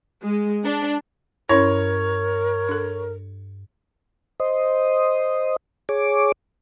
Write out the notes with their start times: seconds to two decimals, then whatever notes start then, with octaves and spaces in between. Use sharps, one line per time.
0.24 G#3
0.65 D4
1.49 G2 C#4 E4 A#4 C#5
2.69 D4 A4
4.40 C5 D#5
5.89 G#4 C#5 D6